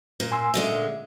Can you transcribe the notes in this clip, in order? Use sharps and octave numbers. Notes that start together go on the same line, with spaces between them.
A#2
G#5 C6 E6
A#2 D3 G#3 E5